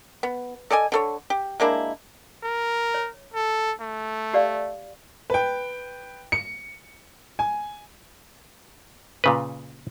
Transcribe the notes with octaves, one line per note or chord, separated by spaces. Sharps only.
B3
A4 D5 D#5 G#5
D3 A4 C#5
G4
G#3 A#3 D4 E4
A#4
C#5
A4
A3
G4 D5 F5
B4 G5
C#7
G#5
A#2 C#3 B4